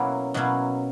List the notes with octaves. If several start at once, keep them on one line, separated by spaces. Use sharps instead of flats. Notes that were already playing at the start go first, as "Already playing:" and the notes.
Already playing: B2 F#3 A#3 C#4 E4
B2 F#3 A#3 C#4 E4